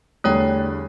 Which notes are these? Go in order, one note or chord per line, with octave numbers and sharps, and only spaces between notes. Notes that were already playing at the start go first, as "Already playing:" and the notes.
E2 D3 G3 A3 C#5 G5